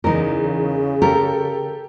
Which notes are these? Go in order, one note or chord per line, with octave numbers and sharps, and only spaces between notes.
E2 C#3 D#4 A#4
G4 A4 A#4